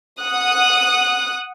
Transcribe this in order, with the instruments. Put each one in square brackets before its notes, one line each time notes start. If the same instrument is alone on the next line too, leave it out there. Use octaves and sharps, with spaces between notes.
[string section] F#5 D#6 F#6